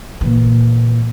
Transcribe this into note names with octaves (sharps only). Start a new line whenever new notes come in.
A#2 E3